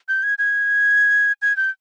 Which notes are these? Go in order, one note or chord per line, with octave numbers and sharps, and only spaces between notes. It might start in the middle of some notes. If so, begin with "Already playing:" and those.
G6
G#6
G#6
G#6
G6